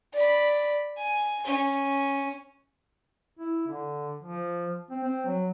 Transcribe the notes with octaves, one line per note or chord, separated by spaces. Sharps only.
D5 B5
G#5
C#4
E4
D3
F3
C4
C4
F#3